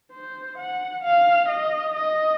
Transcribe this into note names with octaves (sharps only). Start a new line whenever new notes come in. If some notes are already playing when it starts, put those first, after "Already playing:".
C5
F#5
F5
D#5
D#5